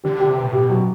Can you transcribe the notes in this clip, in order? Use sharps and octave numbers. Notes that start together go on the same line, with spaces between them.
D3 G4
G4
C3
B4
A2
B2 G4
F#3